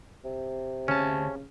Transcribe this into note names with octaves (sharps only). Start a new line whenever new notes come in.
C3
D2 C#3 C#4 A5